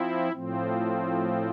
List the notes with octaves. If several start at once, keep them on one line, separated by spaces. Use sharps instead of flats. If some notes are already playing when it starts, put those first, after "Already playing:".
Already playing: F3 C4 E4
A2 F3 C4